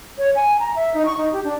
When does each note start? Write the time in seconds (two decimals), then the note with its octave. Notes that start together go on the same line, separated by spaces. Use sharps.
0.18 C#5
0.36 G#5
0.59 A#5
0.76 E5
0.94 D#4
1.06 C#6
1.17 D#4
1.33 G4
1.44 D4